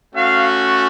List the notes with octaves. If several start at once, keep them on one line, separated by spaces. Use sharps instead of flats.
A3 C#4 F#4 F5